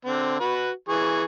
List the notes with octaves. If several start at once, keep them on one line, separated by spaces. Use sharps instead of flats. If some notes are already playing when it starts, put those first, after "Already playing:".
D3 C4
F#4 B4
E3 G#4 C#6